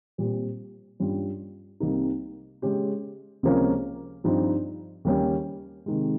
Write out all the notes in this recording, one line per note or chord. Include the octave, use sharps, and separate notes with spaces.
A#2 G3 C4 G4
G2 G3 C#4 F4
C2 C3 G3 A#3 D#4
C#3 G#3 C#4 G4
C#2 C3 F3 A#3 C#4
G2 F3 C4 D#4
D#2 C#3 G3 C#4 G4
C3 D#3 G#3